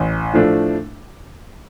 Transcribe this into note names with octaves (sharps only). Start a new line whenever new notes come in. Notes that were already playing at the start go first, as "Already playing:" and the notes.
Already playing: A1
A2 F3 A3 D4